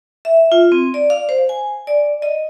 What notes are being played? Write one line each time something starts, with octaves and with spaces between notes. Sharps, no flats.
E5
F4
C4
D5
F5
C5
G#5
D5
D#5